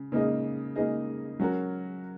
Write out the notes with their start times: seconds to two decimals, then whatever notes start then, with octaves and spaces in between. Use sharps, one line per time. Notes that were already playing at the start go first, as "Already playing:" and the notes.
Already playing: C#3
0.12 C#3 A#3 D#4 G#4 D#5
0.76 C#3 A#3 D#4 G#4 D#5
1.40 F#3 C#4 F#4 A#4